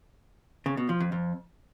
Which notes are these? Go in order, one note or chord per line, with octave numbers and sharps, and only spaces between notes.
C#3
B2
F3
F2
F2